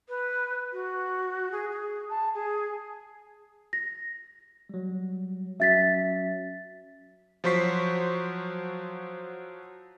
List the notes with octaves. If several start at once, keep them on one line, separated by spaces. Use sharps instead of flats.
B4
F#4
G#4
G#4
A5
G#4
A#6
F#3 G3
F#3 C#4 F#4 E5 A6 B6
F3 F#3 C5 C#6 B6 C7